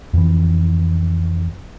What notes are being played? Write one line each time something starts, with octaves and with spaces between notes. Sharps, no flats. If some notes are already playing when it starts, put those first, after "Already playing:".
F2 E3